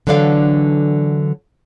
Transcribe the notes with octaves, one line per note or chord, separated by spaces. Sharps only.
D3 E3 F#3 D4 A4 F5